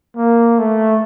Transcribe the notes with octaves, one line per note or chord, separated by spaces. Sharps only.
A#3
A3